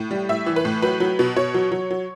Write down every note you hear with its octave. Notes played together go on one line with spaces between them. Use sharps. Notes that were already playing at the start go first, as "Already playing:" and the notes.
Already playing: A2
G3
A2 E5
E3
B4
A2
F#3 B4
F#3
B2
B2 C#5
F#3
F#3
F#3